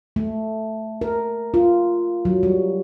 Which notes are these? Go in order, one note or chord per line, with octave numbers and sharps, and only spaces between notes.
A3
A#4
F4
F#3
G3